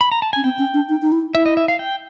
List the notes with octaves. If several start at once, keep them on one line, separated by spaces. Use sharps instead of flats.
B5
A#5
A5
C#4 G#5
C4 G5
C#4
D4
D#4
D#4
E4
E4 E5
D#5
E5
F5
G5